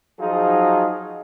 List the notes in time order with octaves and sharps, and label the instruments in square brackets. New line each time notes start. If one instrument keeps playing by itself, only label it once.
[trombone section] F3 F#3 D#4 F4 G#4